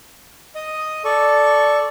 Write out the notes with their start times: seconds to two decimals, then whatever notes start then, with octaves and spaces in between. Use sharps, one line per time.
0.56 D#5 D#6
1.05 A4 D5 C#6